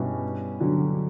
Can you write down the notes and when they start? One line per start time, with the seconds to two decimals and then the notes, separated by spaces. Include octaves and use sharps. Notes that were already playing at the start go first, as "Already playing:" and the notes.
Already playing: G2 B2 G3 C#4 E4
0.60 D3 F#3